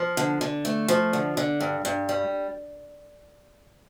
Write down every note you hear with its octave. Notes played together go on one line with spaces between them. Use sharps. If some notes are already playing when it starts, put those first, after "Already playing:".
Already playing: F3
D3
D3
A3
F3
D3
D3
G2
G2
G3